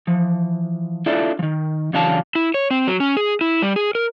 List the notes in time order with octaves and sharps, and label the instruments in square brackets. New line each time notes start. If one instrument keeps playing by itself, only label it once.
[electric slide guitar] E3 F3
D4 E4 F4 A4 D5 E5
D#3 F3
C#3 E3 F#3 D4 F5 A5
E4
C#5
C4
F#3
C#4
G#4
E4
G3
G#4
A#4